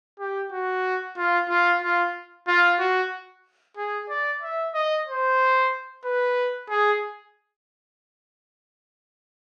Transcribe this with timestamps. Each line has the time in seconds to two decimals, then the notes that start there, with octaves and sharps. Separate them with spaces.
0.20 G4
0.53 F#4
1.17 F4
1.49 F4
1.83 F4
2.48 F4
2.80 F#4
3.77 G#4
4.10 D5
4.42 E5
4.74 D#5
5.07 C5
6.05 B4
6.70 G#4